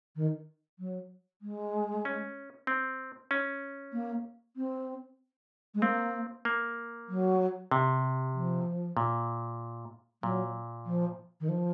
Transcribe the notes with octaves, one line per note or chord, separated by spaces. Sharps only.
D#3
F#3
G#3
C#4
C4
C#4
A#3
C4
G#3
A#3 C4
A#3
F#3
C3
F3
A#2
A#2 F#3
F3
D#3
F3